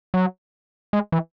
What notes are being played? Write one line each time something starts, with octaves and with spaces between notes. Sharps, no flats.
F#3
G#3
E3